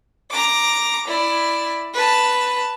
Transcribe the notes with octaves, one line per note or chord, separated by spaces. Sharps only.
A#5 D6
E4 D5
B4 A5